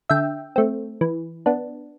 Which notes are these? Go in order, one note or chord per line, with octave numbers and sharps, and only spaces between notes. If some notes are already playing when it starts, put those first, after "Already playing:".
D3 E5 G5
A3 C4
E3
B3 D4